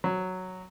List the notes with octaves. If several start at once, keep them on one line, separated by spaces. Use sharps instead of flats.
F#3